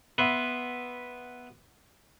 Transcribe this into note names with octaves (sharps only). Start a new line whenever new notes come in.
B3 B4 E5 C6